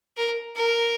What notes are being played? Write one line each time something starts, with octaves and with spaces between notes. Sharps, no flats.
A#4
A#4